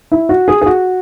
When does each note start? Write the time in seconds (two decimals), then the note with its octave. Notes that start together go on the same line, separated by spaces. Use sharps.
0.12 E4
0.29 F#4
0.48 G#4
0.62 G#4
0.66 F#4